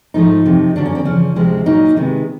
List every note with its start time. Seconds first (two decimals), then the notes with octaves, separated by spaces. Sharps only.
0.14 G#2 F3 A3 D#4
0.45 F2 C3 F3
0.76 F#2 D3 F#3 D4
0.86 C#4
0.95 C4
1.05 E2 C#3 F3 C#4
1.36 D2 C3 F3 G#3 C4
1.66 A#2 F#3 A#3 D#4
1.96 C3 D#3 G#3 B3